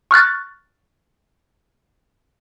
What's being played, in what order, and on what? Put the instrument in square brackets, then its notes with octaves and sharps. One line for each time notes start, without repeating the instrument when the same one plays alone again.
[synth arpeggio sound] C#6 F6 F#6 A6